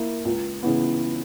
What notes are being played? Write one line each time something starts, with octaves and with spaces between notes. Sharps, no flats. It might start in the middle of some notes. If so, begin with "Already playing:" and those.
Already playing: A#3 E4
C#2
C#3 E3 B3